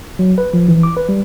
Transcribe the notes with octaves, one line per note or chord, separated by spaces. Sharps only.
F#3
B4
F3
E3
D6
B4
G3